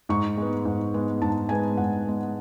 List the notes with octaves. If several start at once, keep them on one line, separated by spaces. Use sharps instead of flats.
G#2 C#6
G#3 B3
G#2
G#3 B3
G#2 A5
G#3 B3 G#5
G#2 F#5
G#3 B3